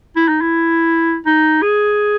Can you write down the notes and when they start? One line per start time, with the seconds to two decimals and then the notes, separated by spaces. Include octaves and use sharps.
0.16 E4
0.28 D#4
0.41 E4
1.26 D#4
1.62 G#4